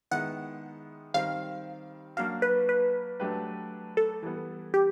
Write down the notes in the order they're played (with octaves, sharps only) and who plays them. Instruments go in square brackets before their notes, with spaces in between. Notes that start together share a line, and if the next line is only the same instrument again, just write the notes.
[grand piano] D#3 G#3 B3 E4 [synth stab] F#5
[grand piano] D#3 G3 C4 [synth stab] F5
[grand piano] F#3 A#3 D4 F#4 [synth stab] F5
[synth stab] B4
B4
[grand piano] F#3 A3 D4 G4 B4
[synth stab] A4
[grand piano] E3 G3 B3
[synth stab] G4